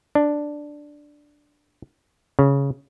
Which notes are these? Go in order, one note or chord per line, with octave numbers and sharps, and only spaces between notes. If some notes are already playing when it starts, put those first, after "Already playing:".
D4
C#3